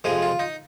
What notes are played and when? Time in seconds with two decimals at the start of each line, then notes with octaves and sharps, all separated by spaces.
0.04 F2 C3 F3 G#3 G#4
0.22 F4
0.39 D#4